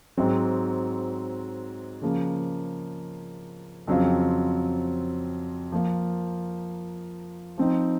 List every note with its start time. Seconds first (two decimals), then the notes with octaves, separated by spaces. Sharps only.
0.17 G#2 F#3 C4
2.02 C#3 F3 A#3
3.87 F2 C#3 F#3 C4 F4
5.72 F3 A#3 F4
7.58 F3 C4 D#4